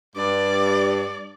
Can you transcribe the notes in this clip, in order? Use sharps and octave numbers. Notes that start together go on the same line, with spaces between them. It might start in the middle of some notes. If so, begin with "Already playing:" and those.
G2 D5